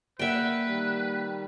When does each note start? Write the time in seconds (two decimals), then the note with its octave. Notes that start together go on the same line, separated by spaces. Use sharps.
0.19 A#3 B4 D5 E5 F#5 G5
0.67 D#3 G3